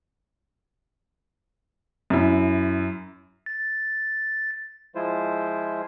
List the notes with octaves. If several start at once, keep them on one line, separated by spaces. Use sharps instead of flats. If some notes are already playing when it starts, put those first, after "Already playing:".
F#2 E4
A6
F3 G#3 E4 F4 C5